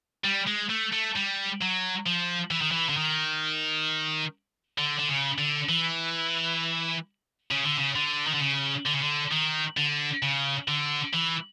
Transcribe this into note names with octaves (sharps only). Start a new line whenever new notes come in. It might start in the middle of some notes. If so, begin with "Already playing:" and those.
G3
G#3
A3
A3
G3
F#3
F3
E3
D#3
E3
D3
D#3
D3
D3
C#3
D3
E3
C#3
D3
C#3
D3
D#3
D3
C#3
D3
C#3
D3
D#3
D3
C#3
D3
E3